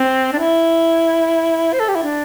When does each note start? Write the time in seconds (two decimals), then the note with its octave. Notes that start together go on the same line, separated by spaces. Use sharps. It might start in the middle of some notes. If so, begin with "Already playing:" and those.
Already playing: C4
0.33 D4
0.38 E4
1.73 C5
1.80 A4
1.89 G4
1.95 E4
2.03 D4